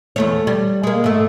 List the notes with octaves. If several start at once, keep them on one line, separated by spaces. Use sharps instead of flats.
E2 A3 C#5
G3
G#3 A#3
G#2 A3